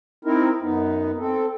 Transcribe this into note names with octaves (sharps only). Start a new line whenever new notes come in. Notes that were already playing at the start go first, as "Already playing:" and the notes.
C4 D#4 E4 A#4
F#2 B3 D#4
C4 A4